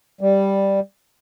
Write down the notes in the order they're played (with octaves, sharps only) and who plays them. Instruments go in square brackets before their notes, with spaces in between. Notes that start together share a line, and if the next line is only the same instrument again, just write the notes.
[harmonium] G3